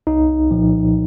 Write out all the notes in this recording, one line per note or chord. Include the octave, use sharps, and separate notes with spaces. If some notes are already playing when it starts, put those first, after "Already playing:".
C2 D#4
A#2 F3